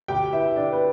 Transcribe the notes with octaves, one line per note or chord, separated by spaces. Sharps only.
D2 G4 G5
B3 E4 E5
D3 D4 D5
B3 B4